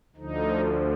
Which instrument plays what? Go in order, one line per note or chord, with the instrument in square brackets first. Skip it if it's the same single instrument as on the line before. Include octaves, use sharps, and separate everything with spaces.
[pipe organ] D2 D3 F3 D#4